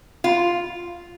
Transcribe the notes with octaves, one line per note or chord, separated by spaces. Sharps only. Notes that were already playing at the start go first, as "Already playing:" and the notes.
F4